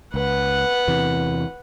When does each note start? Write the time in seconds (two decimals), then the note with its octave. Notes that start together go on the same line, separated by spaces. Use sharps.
0.14 C#2 B4 F#5
0.88 E2 C3 E3